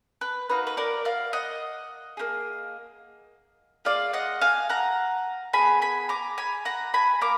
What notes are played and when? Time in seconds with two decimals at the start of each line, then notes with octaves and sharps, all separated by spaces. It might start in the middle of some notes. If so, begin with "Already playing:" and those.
0.21 B4
0.49 A#3 D#4 F#4 B4
0.67 B4
0.77 A#4 D5
1.05 D5 F5
1.33 D#5 F#5
2.17 A#3 D4 G#4
3.85 A#3 F4 G#4 D5 F5
4.13 D#5 F#5
4.41 F5 G#5
4.69 F#5 A#5
5.53 F4 G#4 G#5 B5
5.58 B3
5.82 G#5 B5
6.09 A#5 D6
6.38 G#5 B5
6.65 F#5 A#5
6.94 G#5 B5
7.21 A#3 A#5 D6